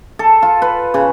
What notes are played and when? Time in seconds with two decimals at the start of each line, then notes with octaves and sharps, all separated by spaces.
0.19 A4
0.43 F4
0.62 B4
0.94 C#3